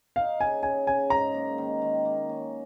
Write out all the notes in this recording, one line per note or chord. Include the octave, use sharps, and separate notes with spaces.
D#4 F5
C#3 G#5
C#3 G#5
C#3 G#5
G#2 A#5
A#3
D#3
D#3
A#3
C#4